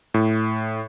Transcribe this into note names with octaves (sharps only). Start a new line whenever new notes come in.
A2